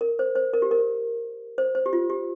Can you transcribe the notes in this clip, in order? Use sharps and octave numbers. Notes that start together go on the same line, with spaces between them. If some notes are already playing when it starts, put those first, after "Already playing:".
A#4
C5
C5
A#4
G4
A#4
C5
C5
G4
F4
G4